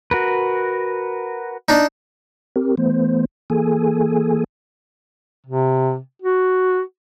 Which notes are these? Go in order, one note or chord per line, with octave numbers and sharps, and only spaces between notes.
F#4 A#4 B4
D4 D#4
C4 G4 A#4
E3 A3 B3 C5
E3 A#3 G#4 A4 G#5
C3
F#4